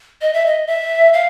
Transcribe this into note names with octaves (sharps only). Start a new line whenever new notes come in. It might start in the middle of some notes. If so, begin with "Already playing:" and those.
D#5
E5
D#5
E5
F5